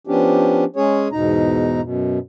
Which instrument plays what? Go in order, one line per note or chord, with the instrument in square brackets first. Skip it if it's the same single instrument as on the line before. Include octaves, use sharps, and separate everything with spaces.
[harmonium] F3 B3 C#4 D4 G4
G#3 C#4 G#4 C#5
E2 G#2 B2 D#4 A#5
F#2 B2